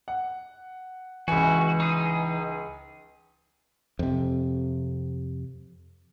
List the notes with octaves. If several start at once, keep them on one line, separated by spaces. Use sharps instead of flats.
F#5
C#2 E3 F#4 G#5
D#4 G#4
F2 C3